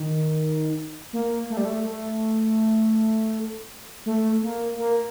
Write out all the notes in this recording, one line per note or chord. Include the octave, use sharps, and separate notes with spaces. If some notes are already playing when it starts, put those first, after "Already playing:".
Already playing: D#3
A#3
A3
G3
A3
A3
A3
A#3
A#3